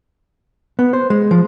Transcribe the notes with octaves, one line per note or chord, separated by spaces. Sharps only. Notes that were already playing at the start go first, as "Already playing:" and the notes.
B3
C5
G#3
F3